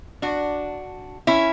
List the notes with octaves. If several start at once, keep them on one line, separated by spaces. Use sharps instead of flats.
D4 F#4
C#4 E4